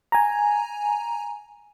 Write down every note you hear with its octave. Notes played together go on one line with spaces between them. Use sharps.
G#5 A#5